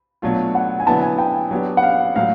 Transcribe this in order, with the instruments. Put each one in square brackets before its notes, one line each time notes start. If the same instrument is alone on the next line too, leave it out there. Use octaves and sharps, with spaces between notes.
[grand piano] B2 F#3 A3 D4 F4
[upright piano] F#5
G#5
[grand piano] D3 F#3 B3 E4 [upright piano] A5
[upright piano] G#5
G5
[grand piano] F#3 B3 D4 G4
[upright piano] F#5
F5
[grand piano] A2 F#3 [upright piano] F5